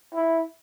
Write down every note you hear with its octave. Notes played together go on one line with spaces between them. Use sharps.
E4